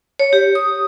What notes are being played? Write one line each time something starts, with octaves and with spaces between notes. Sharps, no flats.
C#5
G4
D#6